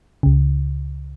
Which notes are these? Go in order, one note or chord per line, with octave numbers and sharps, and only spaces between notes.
C#2 C#3